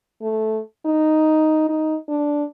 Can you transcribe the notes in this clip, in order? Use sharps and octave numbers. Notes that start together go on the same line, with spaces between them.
A3
D#4
D#4
D4